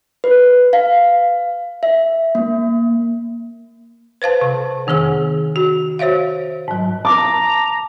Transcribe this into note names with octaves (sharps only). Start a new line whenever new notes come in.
B4
F5
E5
A#3
B4 C5 F5 A5
C3
F2 D#3 B3 G#4 E6
F#4
F#4 C5 C#5 E5 F5
G#2 F#3
A5 A#5 D6